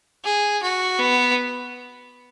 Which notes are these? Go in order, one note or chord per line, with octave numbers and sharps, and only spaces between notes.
G#4
F#4
B3